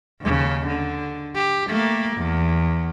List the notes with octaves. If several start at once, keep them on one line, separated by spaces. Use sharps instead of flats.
D#2 C#3
D3
G4
A3 A#3
E2